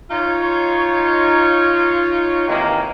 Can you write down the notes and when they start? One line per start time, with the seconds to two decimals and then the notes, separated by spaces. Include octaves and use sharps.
0.11 D#4 F4 C#5
2.48 C3 D#3 E3 G#3 A#3